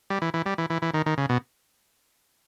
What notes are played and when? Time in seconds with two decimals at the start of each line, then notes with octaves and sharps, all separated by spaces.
0.10 G3
0.22 E3
0.34 E3
0.46 G3
0.58 E3
0.70 E3
0.82 E3
0.94 D#3
1.06 D#3
1.18 C#3
1.29 B2